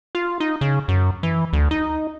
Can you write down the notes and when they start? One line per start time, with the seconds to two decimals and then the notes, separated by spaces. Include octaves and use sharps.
0.15 F4
0.40 D#4
0.61 C#3
0.88 F#2
1.23 E3
1.53 D2
1.71 D#4